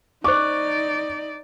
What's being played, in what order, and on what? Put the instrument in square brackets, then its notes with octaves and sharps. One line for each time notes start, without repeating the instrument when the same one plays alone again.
[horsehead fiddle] D#4 D5 [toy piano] C5 C#6 [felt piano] D6